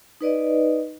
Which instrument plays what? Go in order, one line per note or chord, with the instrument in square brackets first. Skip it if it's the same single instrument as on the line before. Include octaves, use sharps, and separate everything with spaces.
[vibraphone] D#4 B4 D5 D#5